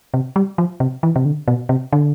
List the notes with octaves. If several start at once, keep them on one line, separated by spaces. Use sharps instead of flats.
C3
G3
F3
C3
E3
C3
D3
B2
C3
D3